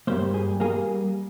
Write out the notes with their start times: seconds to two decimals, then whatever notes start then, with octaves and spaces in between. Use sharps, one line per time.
0.07 G2 G3 A#3 C5
0.34 G#4
0.60 G3 A#3 G#4